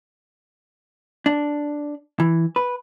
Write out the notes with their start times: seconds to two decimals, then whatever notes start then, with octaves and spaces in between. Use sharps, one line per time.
1.26 D4
2.20 E3
2.56 B4